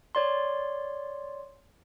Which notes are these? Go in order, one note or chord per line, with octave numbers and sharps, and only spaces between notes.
C#5 D5 C6